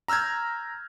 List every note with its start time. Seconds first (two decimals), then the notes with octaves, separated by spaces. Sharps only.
0.08 A#5 E6 F6 G6 G#6